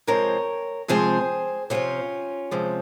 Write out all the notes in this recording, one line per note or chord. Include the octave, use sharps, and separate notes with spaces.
C3 F3 G#3 C4 A#4 C#5
C3 F3 G#3 C4 G#4 C5
C3 F3 G#3 C4 C#4 F4
C3 F3 G#3 C4